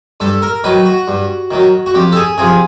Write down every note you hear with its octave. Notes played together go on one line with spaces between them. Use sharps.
G2 A4
A#4
D#3 F#3 B4
F#4
G2
D#3 F#3
F#4
F2 G4
A4
G#4
C3 F3 G#4